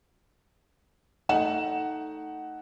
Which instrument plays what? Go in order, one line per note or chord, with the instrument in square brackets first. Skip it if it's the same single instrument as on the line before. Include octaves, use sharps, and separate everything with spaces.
[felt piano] A3 D#4 F#5 E7